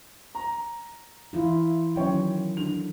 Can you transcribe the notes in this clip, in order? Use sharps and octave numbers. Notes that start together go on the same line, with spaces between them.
A#5
E3 E4 F4
D#3 F#3 C#4 C#5 G5
D3 F7